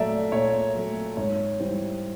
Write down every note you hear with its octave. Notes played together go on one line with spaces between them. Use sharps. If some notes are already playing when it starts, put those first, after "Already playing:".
Already playing: A#2 F#3 A3 D5 E5 A#5
A#2 C#5
F#3 A3
G#2 C#5
E3 G3 C5